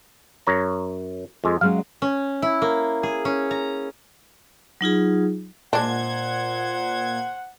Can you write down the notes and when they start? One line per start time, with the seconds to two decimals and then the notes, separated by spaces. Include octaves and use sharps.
0.47 F#2 C#5 A#5
1.44 F2 G#3
1.61 F#3 G#3 C#4 F5
2.02 C#4
2.42 E4
2.62 A#3
3.03 G#4
3.25 C#4
3.51 A#5
4.81 F#3 D#4 F4 G#4
5.73 A#2 G#3 D4 C5 F#5 G#6